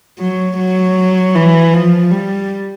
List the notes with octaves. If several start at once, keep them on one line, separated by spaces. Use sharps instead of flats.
F#3
F#3
E3
F3
G3